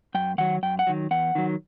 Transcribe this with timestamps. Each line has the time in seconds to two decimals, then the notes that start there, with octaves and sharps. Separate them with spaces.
0.15 F#2 G5
0.38 D#3 F#3 F#5
0.63 F#2 G5
0.79 F#5
0.87 D#3 F#3
1.11 E2 F#5
1.35 D#3 F#3